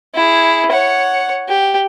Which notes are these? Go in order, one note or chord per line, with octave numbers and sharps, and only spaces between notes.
E4 G#4
C#5 F#5
G4